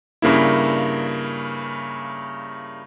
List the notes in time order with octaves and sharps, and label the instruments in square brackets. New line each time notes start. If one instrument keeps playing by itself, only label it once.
[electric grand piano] G2 C#3 A#3 E4